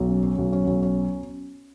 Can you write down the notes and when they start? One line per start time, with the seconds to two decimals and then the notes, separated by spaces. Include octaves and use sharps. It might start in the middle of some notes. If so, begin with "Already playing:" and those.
Already playing: B1
0.08 C#4
0.23 C#4
0.38 B1
0.52 C#4
0.67 B1
0.82 C#4